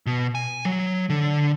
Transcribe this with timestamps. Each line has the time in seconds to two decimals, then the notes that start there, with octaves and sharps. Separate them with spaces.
0.06 B2
0.35 G#5
0.65 F#3
1.10 D3